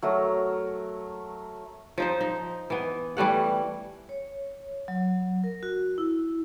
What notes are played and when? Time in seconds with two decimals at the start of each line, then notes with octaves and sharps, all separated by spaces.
0.02 F#3 A3 A#4
1.98 F3 D#4 C5
2.21 D#4
2.70 E3 B3
3.17 E3 G3 A3 F#5
4.09 C#5
4.88 F#3
5.44 A#4
5.63 F#4
5.98 E4